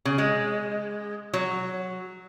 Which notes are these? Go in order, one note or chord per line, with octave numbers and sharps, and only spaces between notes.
C#3
G#3
F#3